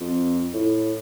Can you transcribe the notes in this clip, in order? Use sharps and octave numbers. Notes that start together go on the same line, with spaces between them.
F2
A2